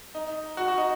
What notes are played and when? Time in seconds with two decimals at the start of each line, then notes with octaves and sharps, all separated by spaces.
0.15 D#4
0.57 F#4
0.68 F#4
0.78 D#4